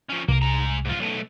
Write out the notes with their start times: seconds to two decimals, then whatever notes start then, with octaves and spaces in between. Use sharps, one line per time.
0.10 F3 C#4
0.29 C2 A#3 A#4
0.42 G#3 A#5
0.85 G#2 F4
0.99 B1 A3